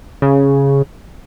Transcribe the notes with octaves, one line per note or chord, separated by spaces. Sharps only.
C#3